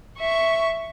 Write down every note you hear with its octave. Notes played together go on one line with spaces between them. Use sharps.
E5 C#6